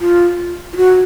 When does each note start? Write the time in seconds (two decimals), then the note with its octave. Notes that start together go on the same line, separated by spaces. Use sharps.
0.01 F4
0.73 F4
0.77 F#4